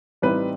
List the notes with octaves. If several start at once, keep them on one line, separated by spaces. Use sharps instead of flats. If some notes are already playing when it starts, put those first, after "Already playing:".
A1 A2 G3 C4 D#4 B4